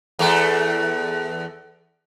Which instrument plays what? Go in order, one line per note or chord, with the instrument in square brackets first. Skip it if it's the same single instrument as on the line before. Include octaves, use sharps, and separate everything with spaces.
[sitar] E2 A3